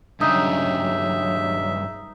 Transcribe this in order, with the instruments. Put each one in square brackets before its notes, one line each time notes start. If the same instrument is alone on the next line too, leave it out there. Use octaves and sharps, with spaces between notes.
[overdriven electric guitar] G2 C#3 [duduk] F#3 [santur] D#4 [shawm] E5